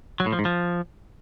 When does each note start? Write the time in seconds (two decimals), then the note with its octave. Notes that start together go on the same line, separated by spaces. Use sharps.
0.20 F#3
0.26 A2
0.33 F3
0.39 G#2
0.45 F3